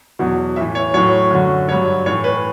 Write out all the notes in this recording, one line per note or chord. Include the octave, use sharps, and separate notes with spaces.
E2 B2 F#3
A2 E3 E5
C#5
A2 F#3 C#5
F#2 D3 F#3
G2 F#3 C#5
A2 E3 C#5
B4